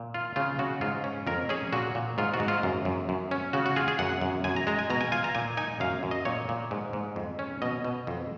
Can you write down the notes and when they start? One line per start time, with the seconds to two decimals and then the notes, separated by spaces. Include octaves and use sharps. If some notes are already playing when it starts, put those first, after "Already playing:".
Already playing: A#2
0.14 F4
0.36 C#3 F4
0.59 C#3 F#4
0.81 G#2 F4
1.04 C#4
1.27 F2 A#4
1.49 C#4 G#4
1.73 A#2 F#4
1.95 A#2
2.18 G#2 F4
2.34 F#4
2.40 G#2
2.48 F4
2.63 F#2
2.85 F#2
3.09 F#2
3.31 C#4
3.53 C#3 F#4
3.66 F#4
3.76 F4 G#4
3.88 G#4
3.99 F#2 F#5
4.21 F#2
4.44 F#2 G#5
4.56 A#5
4.67 G#3 A#5
4.79 G#5
4.90 B2 A#5
5.01 G#5
5.12 F4 G#5
5.24 A#5
5.35 A#2 G#5
5.57 D#4 G#5
5.80 F#2 F5
6.03 F#2
6.11 D#5
6.25 A#2 C#5
6.49 A#2
6.71 G#2
6.93 G#2
7.16 F2
7.39 C#4
7.62 B2 D#5
7.84 B2
8.07 F2